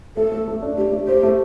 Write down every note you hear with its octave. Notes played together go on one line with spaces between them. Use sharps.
A3 A4
A3
A3
D4
A3 G4
A3
G4 C5
A3